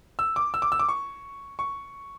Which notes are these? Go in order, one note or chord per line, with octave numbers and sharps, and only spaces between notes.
E6
D6
E6
D6
E6
D6
C#6
C#6